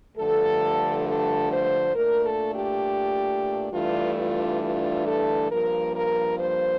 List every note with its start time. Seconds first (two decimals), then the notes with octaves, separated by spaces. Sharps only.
0.17 G2 D3 F3 A3 A4
1.06 A4
1.51 C5
1.95 A#2 A3 D4 A#4
2.25 A4
2.55 G4
3.73 G2 E3 A3 D4 F4
4.17 F4
4.61 F4
5.06 A4
5.51 G2 F3 A#3 A#4
5.95 A#4
6.39 C5